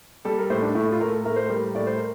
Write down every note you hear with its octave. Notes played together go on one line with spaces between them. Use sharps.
G3 A4
A#4
A2 C5
D4
A2 E4
F4
A2 A#4
A4
A2 A#4
C5
G3 A#4
A2 D5
C5
A#4